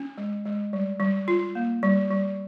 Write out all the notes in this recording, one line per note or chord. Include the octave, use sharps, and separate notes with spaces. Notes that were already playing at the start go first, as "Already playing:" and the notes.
Already playing: C#4
G#3
G#3
G3
G3
F4
A#3
G3
G3